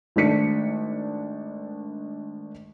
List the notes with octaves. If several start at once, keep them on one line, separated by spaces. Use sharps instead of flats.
G#1 A3 D4 B6 C#7